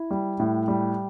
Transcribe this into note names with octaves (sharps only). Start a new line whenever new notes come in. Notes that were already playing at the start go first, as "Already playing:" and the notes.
Already playing: E4
G3
A2
G3